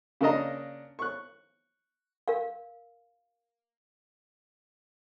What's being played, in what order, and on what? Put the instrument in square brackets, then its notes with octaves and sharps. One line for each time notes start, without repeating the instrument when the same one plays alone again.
[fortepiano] C#3 A#3 D4 D#5 A#5
C#6 F#6
[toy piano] A#4 F5